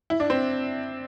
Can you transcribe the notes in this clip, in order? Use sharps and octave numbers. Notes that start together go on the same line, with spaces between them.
E4
D4
C4